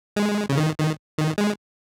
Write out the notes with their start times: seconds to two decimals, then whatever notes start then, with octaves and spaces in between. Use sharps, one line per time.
0.16 G#3
0.49 C#3
0.57 D#3
0.78 D#3
1.18 D#3
1.38 G#3